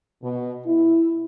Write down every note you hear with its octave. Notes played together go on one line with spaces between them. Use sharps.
B2
E4